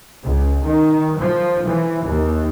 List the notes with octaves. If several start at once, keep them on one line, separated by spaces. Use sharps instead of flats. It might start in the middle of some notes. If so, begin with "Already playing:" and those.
C#2
D#3
F3
E3
D#2